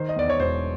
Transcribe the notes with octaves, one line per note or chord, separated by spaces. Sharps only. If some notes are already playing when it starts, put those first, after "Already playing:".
Already playing: D#3 C5
D#5
E2 D5
C#5
E1 C5